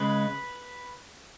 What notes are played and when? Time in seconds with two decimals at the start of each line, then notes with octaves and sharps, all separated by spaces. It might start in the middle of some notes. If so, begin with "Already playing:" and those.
Already playing: C#3 G#3 B4